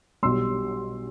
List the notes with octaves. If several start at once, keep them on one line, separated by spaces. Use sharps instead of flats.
B1 B2 G3 C6 E6